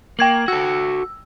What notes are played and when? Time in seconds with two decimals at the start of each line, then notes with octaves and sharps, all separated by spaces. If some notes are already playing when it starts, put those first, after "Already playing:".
0.19 A#3 G5 G#6 F#7
0.48 F#4 A4 E6